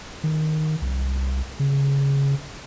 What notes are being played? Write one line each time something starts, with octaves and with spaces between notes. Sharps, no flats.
D#3
C2
C#3